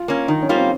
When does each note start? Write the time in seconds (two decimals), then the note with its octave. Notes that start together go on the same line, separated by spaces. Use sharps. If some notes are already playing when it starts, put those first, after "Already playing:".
Already playing: F4
0.08 A#3 C#4
0.28 D#3 D#4
0.42 C#4
0.49 G3 A#3 F4
0.56 C4